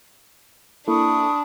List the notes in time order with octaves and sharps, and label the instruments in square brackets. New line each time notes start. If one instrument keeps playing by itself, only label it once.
[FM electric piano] A#3 E4 A4 [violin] D4 [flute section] B5 C#6 D#6